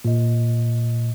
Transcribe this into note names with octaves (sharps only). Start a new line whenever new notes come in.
A#2 D#5